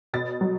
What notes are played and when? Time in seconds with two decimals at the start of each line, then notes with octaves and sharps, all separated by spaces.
0.14 B2 A6
0.41 F#3